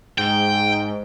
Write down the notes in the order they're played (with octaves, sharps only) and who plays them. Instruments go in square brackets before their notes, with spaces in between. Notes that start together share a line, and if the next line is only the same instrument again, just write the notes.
[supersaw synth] G#2 [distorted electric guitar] G5